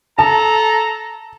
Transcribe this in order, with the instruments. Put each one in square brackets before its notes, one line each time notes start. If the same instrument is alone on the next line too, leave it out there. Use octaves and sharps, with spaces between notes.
[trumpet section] A4 A#5 [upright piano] A5